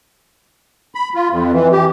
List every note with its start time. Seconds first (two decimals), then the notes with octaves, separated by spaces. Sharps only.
0.95 B5
1.15 F4
1.30 F2
1.53 E3
1.72 G4